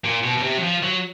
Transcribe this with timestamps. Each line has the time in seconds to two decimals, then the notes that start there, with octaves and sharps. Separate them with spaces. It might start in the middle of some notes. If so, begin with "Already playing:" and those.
0.04 A#2
0.23 B2
0.37 B2
0.43 C3
0.57 F#3
0.63 F3
0.83 F#3